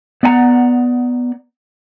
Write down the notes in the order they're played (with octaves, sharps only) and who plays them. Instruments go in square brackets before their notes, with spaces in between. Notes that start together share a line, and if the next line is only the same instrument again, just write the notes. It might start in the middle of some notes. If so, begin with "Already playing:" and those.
[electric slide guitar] B3 D5 F#5 G#5 A#5